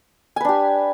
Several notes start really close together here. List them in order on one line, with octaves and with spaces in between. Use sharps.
G#5 B4 D4 G4